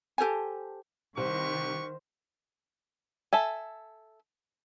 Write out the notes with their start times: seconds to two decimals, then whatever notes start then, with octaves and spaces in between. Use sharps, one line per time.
0.18 G4 A4 C5 G#5
1.17 C2 D#3 G3 G4 B4 C5 C#6
3.33 A4 E5 G#5